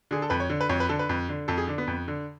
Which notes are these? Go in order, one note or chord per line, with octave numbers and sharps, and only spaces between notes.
D3 G#4
A4
F2 B4
C#5
D3
B4
F2 C#5
B4
D3 A4
B4
F2
D3
F2 A4
G#4
D3 D4
B3
F2
D3